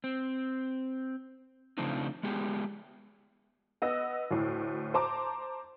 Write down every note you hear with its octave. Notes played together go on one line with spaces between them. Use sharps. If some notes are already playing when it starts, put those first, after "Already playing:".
C4
C#3 F3 A3 C4 D4 D#4
G#3 B3 G4 G#4
B3 D#5 E6 A#6
D2 A2
C5 A5 A#5 D6